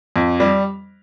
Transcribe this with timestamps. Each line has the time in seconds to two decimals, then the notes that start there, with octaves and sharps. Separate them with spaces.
0.16 F2
0.40 G3